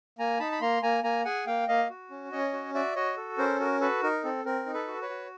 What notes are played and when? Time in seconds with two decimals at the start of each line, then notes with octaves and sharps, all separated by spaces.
0.19 A#3 G#5 A#5
0.40 D#4 A5 B5
0.52 B5
0.61 A#3 A#5 C6
0.82 A#3 G#5 A#5
1.04 A#3 G#5 A#5
1.25 G#4 F#5 G#5
1.46 A#3 F5 G5
1.68 A#3 D#5 F5
1.90 F#4
2.10 C#4
2.32 C#4 C#5 D#5
2.53 F#4
2.74 F#4 D5 E5
2.96 F#4 C#5 D#5
3.17 A4
3.38 C#4 A#4 C5
3.60 F#4 A#4
3.81 F#4 A4 B4
4.03 D#4 A#4
4.24 C4 A4
4.45 C4 A#4
4.66 D#4
4.74 A4 B4
4.88 F#4
5.01 B4 C#5
5.09 F#4